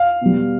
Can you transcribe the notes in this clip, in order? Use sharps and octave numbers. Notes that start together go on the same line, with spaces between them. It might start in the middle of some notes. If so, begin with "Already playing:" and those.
Already playing: F5
B2 G3